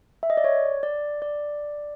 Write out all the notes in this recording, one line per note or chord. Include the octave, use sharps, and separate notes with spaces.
E5
D#5
D5
C#5
D5
D5